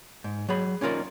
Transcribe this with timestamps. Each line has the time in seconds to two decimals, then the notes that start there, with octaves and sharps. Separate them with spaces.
0.24 G#2
0.49 F#3 G#4 B5
0.81 A#3 C#4 D#4 F4 A#4 D5